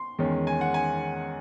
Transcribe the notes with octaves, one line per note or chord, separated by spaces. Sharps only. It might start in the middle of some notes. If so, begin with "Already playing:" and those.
Already playing: C6
E2 D#3 G#3 C#4
G#5
F#5
G#5